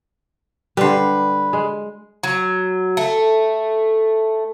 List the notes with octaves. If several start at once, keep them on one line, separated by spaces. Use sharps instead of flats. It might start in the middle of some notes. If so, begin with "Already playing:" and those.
D3 G3 B4 C6
G#3
F#3
A3